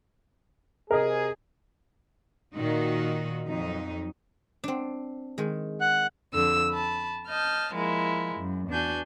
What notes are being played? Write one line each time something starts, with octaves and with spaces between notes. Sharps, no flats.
C3 G#4 A#4 D#5
A#2 D#3 D#4 F#4
F2 F#3 D#4
C4 D4
D#3 G#3
F#5 F#6
F2 D3 E6
A5 B5
D#5 A5 F6 G6
F3 G#3 A#3 E4
F#2
E2 D4 F#4 G#5 G6